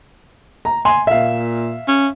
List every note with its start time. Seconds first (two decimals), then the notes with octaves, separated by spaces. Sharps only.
0.65 A#5
0.85 G#5 C6
1.07 A#2 E5 F5
1.88 C#4